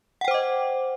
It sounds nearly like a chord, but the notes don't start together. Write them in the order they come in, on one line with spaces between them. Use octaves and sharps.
F#5 G5 C5 D6 D#5